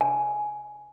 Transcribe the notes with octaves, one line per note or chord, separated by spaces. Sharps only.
G#5